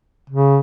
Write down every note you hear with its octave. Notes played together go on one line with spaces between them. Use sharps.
C#3